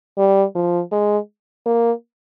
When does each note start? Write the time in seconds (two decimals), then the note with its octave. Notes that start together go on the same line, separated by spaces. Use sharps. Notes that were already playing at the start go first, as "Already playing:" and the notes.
0.18 G3
0.55 F3
0.92 G#3
1.66 A#3